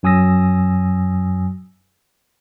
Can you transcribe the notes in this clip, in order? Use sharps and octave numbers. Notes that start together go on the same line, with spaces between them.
F#2 F#3 G#5 D#6 E6 A#6